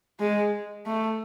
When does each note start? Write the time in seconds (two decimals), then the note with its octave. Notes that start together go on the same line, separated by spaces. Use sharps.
0.20 G#3
0.86 A3